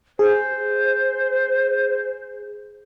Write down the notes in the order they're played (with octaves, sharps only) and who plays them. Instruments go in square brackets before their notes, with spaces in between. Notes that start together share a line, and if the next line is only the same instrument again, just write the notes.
[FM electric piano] G#4 [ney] C5